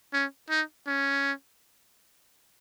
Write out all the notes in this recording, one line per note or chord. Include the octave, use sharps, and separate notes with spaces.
C#4
D#4
C#4